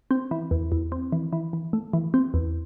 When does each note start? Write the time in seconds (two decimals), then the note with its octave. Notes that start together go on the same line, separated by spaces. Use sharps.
0.11 C4
0.31 E3
0.51 E2
0.72 E2
0.92 C4
1.12 E3
1.33 E3
1.53 E3
1.73 A3
1.94 E3
2.14 C4
2.34 E2